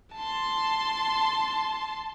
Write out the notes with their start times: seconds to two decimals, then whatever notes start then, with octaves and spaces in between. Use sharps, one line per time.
0.14 A5 C6